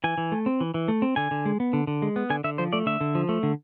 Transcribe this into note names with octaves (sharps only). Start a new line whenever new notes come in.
E3 G#5
E3
A3
C4
E3
E3
A3
C4
D3 G#5
D3
G#3
B3
D3
D3
G#3
B3
D3 G#5
D3 E5
F3 C5
A3 D5
D3 E5
D3
F3
A3
D3